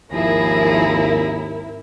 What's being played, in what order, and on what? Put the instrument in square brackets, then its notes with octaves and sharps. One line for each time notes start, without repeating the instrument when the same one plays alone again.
[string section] G#1 E4 A#4 [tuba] D#2 [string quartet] F3 G#4 A#6